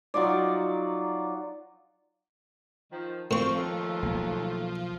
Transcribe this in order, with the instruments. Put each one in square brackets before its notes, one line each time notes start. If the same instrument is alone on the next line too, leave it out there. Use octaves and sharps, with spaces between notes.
[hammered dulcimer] F#3 D#4 F4 D5
[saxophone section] D#3 F3
[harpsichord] A2 C#6 [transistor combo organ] F3 [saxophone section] C4
[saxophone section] D#2 A3
[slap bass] B1 A#3